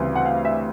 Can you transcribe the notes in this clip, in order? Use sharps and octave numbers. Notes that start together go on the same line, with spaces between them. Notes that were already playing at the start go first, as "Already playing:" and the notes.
Already playing: D2 C#3 E3 G3 C4
F#5
F5
E5